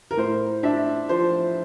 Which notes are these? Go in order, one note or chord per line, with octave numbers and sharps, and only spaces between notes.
A#4
A2 C5
D4 E5
F3 C5